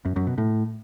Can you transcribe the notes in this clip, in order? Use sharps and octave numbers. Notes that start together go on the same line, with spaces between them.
F#2
F#2
B2
A2